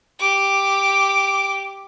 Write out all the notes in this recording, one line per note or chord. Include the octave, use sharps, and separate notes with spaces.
G4 D6